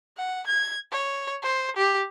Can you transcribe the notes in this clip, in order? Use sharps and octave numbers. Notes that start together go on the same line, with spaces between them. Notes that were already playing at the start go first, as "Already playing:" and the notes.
F#5
G#6
C#5
C5
G4